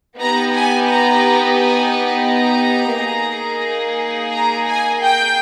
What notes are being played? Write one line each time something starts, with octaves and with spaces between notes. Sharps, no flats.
B3 D#4 G4 A#5
G#5
A#5
G#5
A#5
A#3 D#4 G#4
A#5
G#5
G5